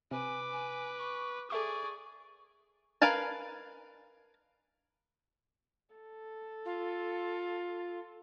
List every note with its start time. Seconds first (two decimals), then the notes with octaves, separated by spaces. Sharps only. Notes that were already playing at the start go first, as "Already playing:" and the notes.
0.11 C3 B4 G#5 D6
0.52 G#5
0.99 C#6
1.50 G#4 A4 D5 E5 C#6 D6
3.02 A#4 B4 F5 G#5 A5
5.95 A4
6.65 F4